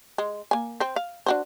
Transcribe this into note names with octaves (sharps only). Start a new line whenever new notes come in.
G#3
A#3 G#5
C4 C5
F5
D4 F#4 C5